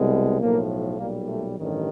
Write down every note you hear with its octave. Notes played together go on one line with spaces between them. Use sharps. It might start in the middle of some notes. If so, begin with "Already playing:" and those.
Already playing: C2 B2 G#3
B1 A2 F3 A#3
B1 A#2 G3 A#3
A3
A1 G2 D#3